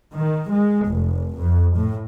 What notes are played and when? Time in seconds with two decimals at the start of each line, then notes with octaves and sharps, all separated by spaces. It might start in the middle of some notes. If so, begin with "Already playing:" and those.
0.14 D#3
0.51 G#3
0.87 F1
1.38 F2
1.76 A2